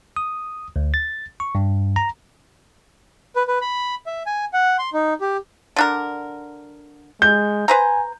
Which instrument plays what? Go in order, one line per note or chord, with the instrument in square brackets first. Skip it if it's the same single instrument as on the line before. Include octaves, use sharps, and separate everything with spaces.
[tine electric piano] D#6
D2
A6
C#6
G2
A#5
[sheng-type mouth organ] B4
B4
B5
E5
G#5
F#5
C6
D#4
G4
[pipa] D3 D4 A#4
[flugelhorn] G#3 [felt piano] G6
[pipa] B4 C5 A#5 [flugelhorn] G#5